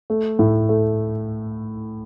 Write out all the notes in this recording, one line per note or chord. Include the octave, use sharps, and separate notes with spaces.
A3
A2
A3